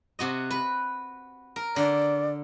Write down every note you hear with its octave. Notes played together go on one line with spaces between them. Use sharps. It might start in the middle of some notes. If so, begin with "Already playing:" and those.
C3 F#4 D#5
B4
A#4
D3 D5